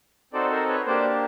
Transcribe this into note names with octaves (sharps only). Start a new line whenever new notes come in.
C4 D#4 F#4 A4 C5 D5
A#4 C5
B4 C#5
A#3 D4 G4 C5 D5